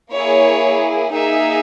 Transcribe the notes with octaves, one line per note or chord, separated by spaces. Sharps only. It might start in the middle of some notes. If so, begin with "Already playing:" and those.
A#3 E4 G#4 C#5
A#3 D#4 G#4 E5